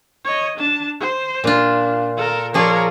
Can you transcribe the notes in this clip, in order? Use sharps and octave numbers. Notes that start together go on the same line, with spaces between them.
C#5 D#5
D4 A5
C5
A#2 D4 F4
A4 A#4
F3 G#4 A#4 C#5 D5